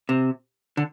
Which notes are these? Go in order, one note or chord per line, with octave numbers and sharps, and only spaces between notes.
C3
D3